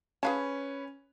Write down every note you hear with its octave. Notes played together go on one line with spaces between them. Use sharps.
C#4 G#4 B4 F5 A5